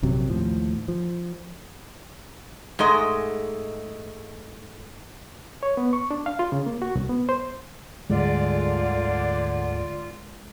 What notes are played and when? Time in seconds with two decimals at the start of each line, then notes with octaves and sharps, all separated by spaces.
0.03 A#1 F#2 C3 F#3
0.30 D#2 A2 F3
0.88 F3
2.79 G#2 G#3 A3 D#5
5.63 C#5
5.77 B3
5.93 C#6
6.11 D4
6.26 F5
6.39 F4
6.52 C#3
6.66 A#3
6.82 F#4
6.95 C2
7.09 B3
7.29 C5
8.10 D2 G#2 D3 G3 G#3 F4 D5